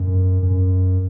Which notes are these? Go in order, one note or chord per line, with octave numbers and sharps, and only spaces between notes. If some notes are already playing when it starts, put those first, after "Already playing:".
Already playing: F#2
F#2